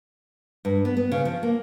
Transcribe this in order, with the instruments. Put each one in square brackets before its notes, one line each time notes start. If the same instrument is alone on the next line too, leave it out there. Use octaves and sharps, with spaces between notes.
[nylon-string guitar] G2
B3
B3
C#3
F3
A#3